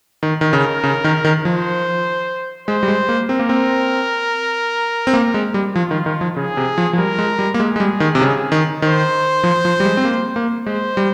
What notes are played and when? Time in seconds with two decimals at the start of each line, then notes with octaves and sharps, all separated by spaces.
0.23 D#3
0.41 D#3
0.53 C#3 A#4
0.84 C#3
1.04 D#3
1.25 D#3
1.45 F3 C5
2.68 G#3 C5
2.83 G3
2.88 G#3
3.09 A#3
3.29 C4 A#4
3.40 A#3
3.49 C4
5.07 C4
5.13 A#3
5.34 G#3
5.54 G3
5.75 F3 F4
5.91 D#3
6.06 D#3
6.21 F3
6.37 C#3 G#4
6.57 C3
6.78 F3
6.93 F3
6.98 G3 A#4
7.19 G#3
7.39 G3
7.54 A#3
7.59 G#3 G#4
7.76 G#3
7.80 G3
8.00 D#3
8.15 C3
8.21 C#3
8.52 D#3
8.82 D#3 C5
9.44 F3
9.65 F3
9.80 G3
9.85 G#3
9.97 C4
10.05 A#3
10.36 A#3
10.67 G#3 C5
10.97 G3